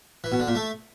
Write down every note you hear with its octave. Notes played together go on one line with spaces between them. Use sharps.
E3
B2
D3
A#2
A3